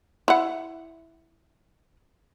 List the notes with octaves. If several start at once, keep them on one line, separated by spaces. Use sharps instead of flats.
E4 F#5